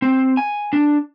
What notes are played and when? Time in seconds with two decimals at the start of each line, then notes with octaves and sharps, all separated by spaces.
0.02 C4
0.37 G#5
0.73 D4